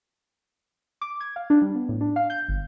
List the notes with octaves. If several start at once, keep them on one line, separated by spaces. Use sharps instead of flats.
D6
G#6
F5
D4
G3
B3
A2
D4
F5
G6
G1